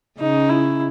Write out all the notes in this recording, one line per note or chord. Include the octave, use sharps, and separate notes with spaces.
C#3 D#4
E4